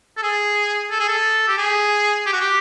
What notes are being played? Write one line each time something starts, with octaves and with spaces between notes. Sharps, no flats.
A4
G#4
A4
G#4
A4
G4
G#4
G4
F#4
G4